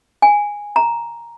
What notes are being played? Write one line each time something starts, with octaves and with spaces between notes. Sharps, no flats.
G#5
A#5